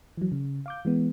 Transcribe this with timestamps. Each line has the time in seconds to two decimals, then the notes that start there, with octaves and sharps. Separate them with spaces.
0.17 E3 F#3
0.32 C#3
0.66 F5 D6 G6
0.85 E3 G#3 B3